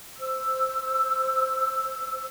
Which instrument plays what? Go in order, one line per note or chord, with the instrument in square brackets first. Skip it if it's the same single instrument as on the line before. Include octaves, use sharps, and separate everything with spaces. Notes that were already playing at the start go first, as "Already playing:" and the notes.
[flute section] C5 E6